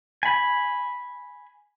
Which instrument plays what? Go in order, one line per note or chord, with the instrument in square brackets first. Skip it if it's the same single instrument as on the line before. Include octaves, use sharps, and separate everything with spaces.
[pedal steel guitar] G#5 B5